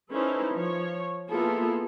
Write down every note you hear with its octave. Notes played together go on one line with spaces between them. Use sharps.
C#4 D#4 E4 A4 B4 C5
F3 C#5
A#3 B3 E4 F4 G#4 A4